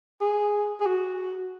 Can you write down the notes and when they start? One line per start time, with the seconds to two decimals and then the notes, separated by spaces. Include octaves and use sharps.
0.21 G#4
0.80 G#4
0.86 F#4